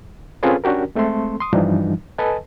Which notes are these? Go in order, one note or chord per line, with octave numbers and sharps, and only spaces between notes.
C4 C#4 F4 G#4 A4 B4
C#4 D4 F#4 G4 A#4
G#3 A3 C4 A4 C6
C6 D#6
G2 E3 F3 G3 D4 D#4
A4 B4 D#5 G#5 A5